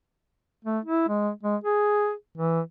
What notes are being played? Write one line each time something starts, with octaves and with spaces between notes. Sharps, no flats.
A3
E4
G#3
G#3
G#4
E3